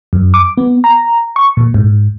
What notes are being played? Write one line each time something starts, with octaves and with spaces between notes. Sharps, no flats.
F#2
D6
B3
A#5
C#6
A#2
G#2